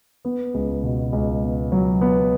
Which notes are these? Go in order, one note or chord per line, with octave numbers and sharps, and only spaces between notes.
B3
C#2
B2
C#2
B3
F#3
B3